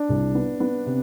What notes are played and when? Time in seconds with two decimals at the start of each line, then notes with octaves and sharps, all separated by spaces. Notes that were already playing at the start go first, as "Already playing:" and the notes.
Already playing: D4
0.09 C2
0.35 B3
0.60 B3
0.86 C3